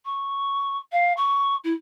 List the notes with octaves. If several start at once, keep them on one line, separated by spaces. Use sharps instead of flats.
C#6
F5
C#6
E4